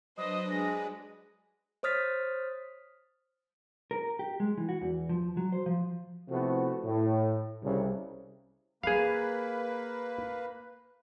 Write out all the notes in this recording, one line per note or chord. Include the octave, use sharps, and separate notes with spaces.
F#3 D4 B4 C5 D#5 D#6
G#3 A#6
C5 C#5 D#6 F6 A6 B6
A#4
G4
G#3
E3
F#4
E2
F3
F#3
C5
F3
C3 F3 A3 B3 E4 F#4
A2
C2 C#3
A#3 G#4 B4 F5